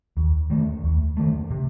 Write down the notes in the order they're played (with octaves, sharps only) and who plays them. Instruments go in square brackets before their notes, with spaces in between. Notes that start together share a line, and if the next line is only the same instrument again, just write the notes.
[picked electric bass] D#2
D#3 A3
D#2
D#3 A3
C3